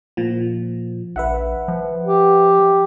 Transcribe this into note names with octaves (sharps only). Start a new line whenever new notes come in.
A#2 F3
A#1 B4 E5 F#5
F3
G4